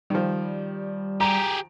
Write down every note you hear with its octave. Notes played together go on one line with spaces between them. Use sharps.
D#3 F3 G3
G4 G#4 A#5